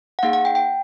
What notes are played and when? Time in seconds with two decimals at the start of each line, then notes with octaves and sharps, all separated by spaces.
0.19 F#5
0.23 A#3 D#4 G#4 F5
0.33 F#5
0.45 G5
0.55 G5